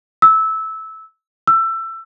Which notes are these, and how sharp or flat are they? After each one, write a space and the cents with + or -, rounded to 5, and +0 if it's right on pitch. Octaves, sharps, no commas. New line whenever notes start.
E6 -15
E6 +20